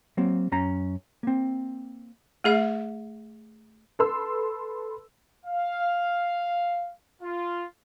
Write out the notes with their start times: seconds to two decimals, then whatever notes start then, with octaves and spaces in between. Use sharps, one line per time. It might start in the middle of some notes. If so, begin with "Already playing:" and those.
0.17 F#3 A#3 C4
0.52 F#2 C#4 A#5
1.23 A#3 C4
2.44 A3 G#4 E5
3.99 A4 B4 C6 E6
5.46 F5
7.22 F4